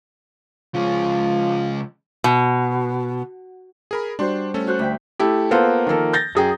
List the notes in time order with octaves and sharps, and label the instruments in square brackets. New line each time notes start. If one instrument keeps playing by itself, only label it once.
[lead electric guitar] C#3 G#3 [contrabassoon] F3
[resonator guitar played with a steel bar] B2
[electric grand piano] G#4 A#4 B5
[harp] G3 F#4 C5 [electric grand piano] D4 C6
[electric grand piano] A3 C#4 A4
[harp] F#4 C5 F#6
D2 E5 G5
[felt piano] A3 E4 G4
A#3 B3 F4 A4 C5
D#3 F3 A#3 A4
G6 A6 A#6
F#2 G#4 G5